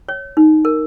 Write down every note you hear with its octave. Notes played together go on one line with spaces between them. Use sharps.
C#5
D#4
A#4